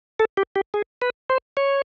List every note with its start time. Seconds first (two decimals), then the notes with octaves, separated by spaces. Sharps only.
0.19 A4
0.37 G4
0.56 G4
0.74 G#4
1.02 B4
1.30 C5
1.57 C#5